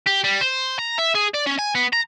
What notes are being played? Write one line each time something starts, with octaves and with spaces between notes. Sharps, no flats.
G4
G3
C5
A#5
E5
G#4
D5
C#4
G#5
B3
A#5